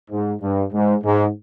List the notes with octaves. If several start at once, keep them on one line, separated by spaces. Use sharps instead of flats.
G#2
G2
G#2
G#2